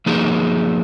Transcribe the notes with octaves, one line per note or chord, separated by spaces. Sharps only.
F3 A#3 D#4 G#4